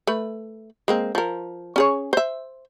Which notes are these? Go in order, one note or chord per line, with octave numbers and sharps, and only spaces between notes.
A3 B4
G#3 A#3 C4
F3 A#4
C#4 G#4 C#5
C5 E5